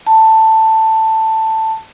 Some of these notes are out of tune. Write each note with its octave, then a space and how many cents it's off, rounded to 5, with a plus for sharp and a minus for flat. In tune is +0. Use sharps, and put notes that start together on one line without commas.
A5 +10